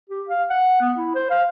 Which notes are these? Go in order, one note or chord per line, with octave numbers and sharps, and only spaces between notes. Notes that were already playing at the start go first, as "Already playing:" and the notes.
G4
F5
F#5
B3
E4
C5
F5